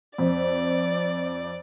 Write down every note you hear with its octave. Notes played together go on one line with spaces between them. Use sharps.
F2 D5